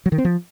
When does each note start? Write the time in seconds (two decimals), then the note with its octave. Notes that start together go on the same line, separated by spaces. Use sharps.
0.06 F#3
0.12 D#3
0.18 C4
0.25 F3